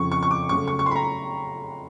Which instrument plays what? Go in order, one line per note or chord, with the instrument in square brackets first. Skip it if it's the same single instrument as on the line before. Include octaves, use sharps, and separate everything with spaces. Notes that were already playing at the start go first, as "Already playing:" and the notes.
Already playing: [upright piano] F2 C#3 F3 C#6
C#6
C#6
D6
C#3 F#3 A3 C#6
C#6
C#6
C6
B5
A#5